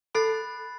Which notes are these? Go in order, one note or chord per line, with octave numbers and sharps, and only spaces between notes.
A4 B5 F#6 A6 C7